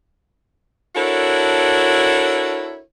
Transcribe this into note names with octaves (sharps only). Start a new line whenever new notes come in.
D4 E4 F#4 A4 A#4 C#5